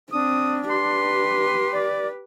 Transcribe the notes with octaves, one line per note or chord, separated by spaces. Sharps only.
C4 D4 D#6
G4 B4 C6
D5